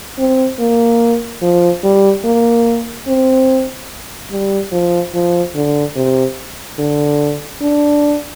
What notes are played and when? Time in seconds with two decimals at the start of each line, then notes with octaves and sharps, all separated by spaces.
0.18 C4
0.59 A#3
1.42 F3
1.83 G3
2.25 A#3
3.07 C4
4.31 G3
4.72 F3
5.14 F3
5.55 D3
5.96 C3
6.79 D3
7.61 D4